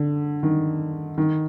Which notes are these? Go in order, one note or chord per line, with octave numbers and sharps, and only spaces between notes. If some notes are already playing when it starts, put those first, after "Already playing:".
Already playing: D3
D#3
D#3